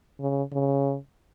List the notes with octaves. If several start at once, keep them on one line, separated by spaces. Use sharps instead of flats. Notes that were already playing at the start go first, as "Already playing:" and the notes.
C#3
C#3